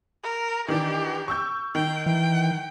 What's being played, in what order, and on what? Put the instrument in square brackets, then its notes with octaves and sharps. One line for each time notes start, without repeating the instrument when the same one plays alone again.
[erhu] A#4
[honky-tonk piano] D#3 E3 D4 [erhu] G4
[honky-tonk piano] C#6 E6 G6
[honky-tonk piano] D#3 [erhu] G5
[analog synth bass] E3 [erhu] G5